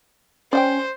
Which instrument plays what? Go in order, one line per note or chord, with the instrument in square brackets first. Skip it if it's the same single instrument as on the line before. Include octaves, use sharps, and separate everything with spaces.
[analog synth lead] C#4 [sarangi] C5 [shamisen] D5 F#5 G5